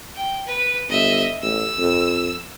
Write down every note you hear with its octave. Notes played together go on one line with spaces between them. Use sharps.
G5
B4
G1 D#5 E5
A1 E6
F2